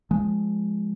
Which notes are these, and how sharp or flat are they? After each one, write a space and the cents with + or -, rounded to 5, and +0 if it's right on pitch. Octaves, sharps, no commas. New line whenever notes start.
F3 +0 G#3 +0